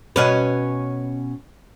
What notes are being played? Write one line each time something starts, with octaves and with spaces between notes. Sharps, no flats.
B2 C#4 B4